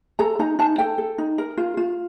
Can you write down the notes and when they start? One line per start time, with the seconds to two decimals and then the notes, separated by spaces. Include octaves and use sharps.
0.19 A4 A#5
0.39 D#4 A#5
0.59 D#4 A5
0.78 A4 G5
0.98 A4
1.18 D#4
1.38 A#4
1.58 F4
1.77 F4